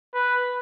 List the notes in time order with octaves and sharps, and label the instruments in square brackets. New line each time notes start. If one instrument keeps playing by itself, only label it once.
[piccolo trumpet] B4